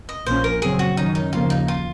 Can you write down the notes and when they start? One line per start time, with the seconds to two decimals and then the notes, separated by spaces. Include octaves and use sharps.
0.09 D#5
0.26 A#1 A#2 F3 A#3 C#4 C5
0.44 A#4
0.62 F#2 C#3 F#3 C4 G#4
0.79 F#4
0.97 F#2 D#3 F#3 C#4 D#4
1.15 D#4
1.33 D#2 C#3 F3 A#3 F4
1.50 D#4
1.68 F4